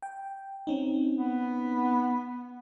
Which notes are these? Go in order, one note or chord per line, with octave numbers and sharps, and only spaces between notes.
G5
C4 C#4 D#4
B3